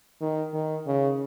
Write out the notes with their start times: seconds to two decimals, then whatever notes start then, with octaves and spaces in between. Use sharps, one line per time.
0.21 D#3
0.53 D#3
0.87 C#3